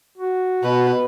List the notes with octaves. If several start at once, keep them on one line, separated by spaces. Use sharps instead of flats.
F#4
B2 B4